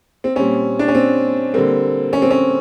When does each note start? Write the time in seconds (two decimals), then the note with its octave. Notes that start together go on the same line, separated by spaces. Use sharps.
0.24 C4
0.36 A#2 G3 C4 C#4
0.79 D4
0.88 C#4
0.95 C4
1.54 D3 G3 A#3 C4
2.13 C#4
2.22 C4
2.31 C#4